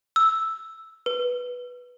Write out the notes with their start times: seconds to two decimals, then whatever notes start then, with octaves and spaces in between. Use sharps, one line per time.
0.16 E6
1.06 B4